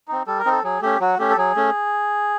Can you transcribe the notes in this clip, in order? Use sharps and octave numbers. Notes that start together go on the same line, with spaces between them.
C4 D#4
G3 A4
A#4
C4 D#4
A4
F#3 G#4
A3 C#4 G4
F#3 F#4
A3 C#4 G4
A4
F#3 G#4
A3 C#4